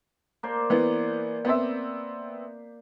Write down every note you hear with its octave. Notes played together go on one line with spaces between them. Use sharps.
A#3 C5 D5
E3 B3
B3 C4 E5